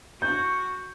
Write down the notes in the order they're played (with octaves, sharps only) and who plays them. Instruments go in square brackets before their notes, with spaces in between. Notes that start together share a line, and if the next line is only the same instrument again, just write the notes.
[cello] F#4 [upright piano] G6